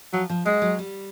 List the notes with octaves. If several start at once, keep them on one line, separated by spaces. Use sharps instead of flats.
F3 F#3
F3
F#3 G#3
F#3
G3